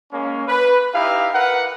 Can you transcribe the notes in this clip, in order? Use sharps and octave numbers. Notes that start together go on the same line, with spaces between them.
G#3 A#3 C#4
B4
D#4 E4 G4 F5
A#4 B4 F#5